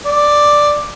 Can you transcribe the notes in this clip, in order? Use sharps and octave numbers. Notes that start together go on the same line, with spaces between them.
D5